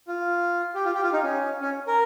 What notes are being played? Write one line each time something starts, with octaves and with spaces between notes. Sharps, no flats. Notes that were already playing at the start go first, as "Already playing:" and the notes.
F4
G4
F4
G4
F4
D#4
C#4
C#4
A#4